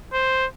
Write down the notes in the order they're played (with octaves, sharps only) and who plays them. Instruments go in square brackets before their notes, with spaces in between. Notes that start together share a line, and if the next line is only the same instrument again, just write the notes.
[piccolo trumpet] C5